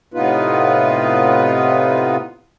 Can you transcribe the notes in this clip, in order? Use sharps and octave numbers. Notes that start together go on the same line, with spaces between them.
A2 C3 B3 D#4 F4 B4